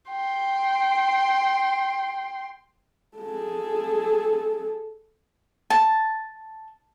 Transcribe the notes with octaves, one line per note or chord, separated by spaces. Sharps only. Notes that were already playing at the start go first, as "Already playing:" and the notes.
G5 C6
G#4 A4
A5